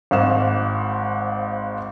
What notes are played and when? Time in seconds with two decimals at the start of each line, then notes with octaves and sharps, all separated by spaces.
0.11 G#1 G#2 F5 E7